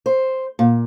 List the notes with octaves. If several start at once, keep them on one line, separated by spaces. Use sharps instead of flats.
C5
A#2